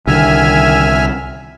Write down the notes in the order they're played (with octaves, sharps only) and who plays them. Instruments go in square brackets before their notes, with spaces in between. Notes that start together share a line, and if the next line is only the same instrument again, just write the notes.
[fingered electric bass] C2 D3 [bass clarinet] D#3 [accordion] E5 G#5 F6